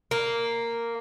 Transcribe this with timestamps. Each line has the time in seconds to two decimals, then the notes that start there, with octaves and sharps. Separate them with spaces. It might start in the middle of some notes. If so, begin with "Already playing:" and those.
0.11 A#3